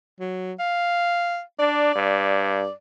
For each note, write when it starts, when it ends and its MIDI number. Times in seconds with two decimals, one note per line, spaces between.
0.20 0.53 54
0.60 1.41 77
1.59 1.92 62
1.59 2.72 74
1.96 2.65 43